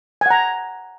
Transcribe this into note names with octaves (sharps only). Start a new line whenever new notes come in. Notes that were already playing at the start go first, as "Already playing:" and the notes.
F#5 G#5 A#5